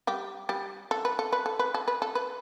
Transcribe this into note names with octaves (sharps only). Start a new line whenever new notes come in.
G3 G4
G3 G4
A4
B4
A4
B4
A4
B4
A4
B4
A4
B4